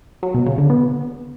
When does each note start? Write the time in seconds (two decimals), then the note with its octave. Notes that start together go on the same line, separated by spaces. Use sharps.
0.23 F#3
0.34 B2
0.46 C#3
0.58 D3
0.70 B3